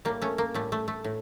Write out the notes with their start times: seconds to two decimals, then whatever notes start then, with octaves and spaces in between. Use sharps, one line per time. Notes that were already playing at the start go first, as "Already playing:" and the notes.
0.05 A2 G3 A#3
0.22 A3 C#4
0.38 A#3
0.54 A2 G3 A3
0.72 A3
0.88 A3
1.04 A2